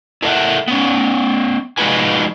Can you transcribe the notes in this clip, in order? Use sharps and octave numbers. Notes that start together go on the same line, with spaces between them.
E4 A4 A#4 D#5 E5 F#5
B3 C#4
F3 G#3 D#4 F#4 B4 G#5